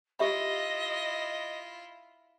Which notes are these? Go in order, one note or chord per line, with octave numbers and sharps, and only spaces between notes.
E4 F4 G4 D#5 E5 B5